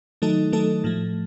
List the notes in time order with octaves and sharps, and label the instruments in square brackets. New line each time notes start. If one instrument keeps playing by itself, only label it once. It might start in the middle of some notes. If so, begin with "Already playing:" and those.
[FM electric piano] D#3 F#3 A3 D#4 A4
D#3 F#3 A3 D#4 A4
A2 F3 A3